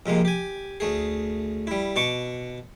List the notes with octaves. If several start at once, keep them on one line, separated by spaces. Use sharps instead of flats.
F2 C3 G#3 A#3
G4 G#5
D2 A3 G#4
G3 E4
B2 A5 C#6 D6